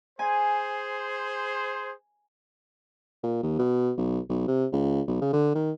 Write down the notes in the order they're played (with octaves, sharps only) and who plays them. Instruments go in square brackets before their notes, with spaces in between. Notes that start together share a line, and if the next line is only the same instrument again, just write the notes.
[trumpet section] G#4 C5 [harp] G#5
[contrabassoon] A#2
D#2
B2
B1
B1
C3
C#2
B1
C#3
D3
D#3